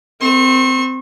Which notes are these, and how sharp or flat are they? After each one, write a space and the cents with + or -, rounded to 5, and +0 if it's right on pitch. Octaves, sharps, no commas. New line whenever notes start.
C4 -15 C#6 -40